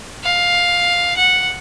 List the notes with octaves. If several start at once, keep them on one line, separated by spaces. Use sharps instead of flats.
F5
F#5